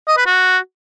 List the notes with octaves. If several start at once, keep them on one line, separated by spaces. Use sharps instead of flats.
D#5
B4
F#4